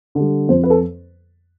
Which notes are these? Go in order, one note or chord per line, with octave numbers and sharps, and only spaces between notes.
D3 G3
F2 C5
B4
A4